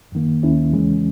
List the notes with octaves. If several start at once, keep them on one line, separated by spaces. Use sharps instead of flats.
F#2 D#3 A#3
D#2 D#3 A#3 C#4 E4
E2 C#3 E3 G#3 C#4